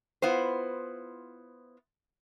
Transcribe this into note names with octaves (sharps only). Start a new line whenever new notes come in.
B3 E4 F4 C5